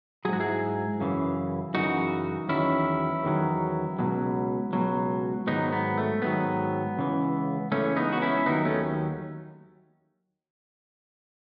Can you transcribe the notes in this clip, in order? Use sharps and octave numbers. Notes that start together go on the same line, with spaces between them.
G#2 F#3 F#4 G#4
E4 G#4
F#2 C#3 E3
F#2 C#3 E3 D#4 F#4
E2 D#3 F#3 C#4 E4
E2 D#3 F#3
C#2 B2 F#3
C#2 B2 F#3
G#2 D#3 F#3 B3 D#4
B3
A3
G#2 D#3 F#3 B3
C#2 C#3 E3
C#2 C#3 E3 A3 C#4
B3 D#4
F#4
C#4 E4
D#2 D#3 F#3 B3 D#4
A3 C#4